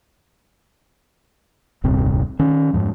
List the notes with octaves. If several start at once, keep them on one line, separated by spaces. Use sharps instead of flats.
D#1 C2 G2 C4
D#3 C#4
F2 G#2 F3